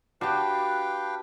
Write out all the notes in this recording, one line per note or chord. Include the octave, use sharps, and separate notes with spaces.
D4 F#4 G4 B4 F5 G5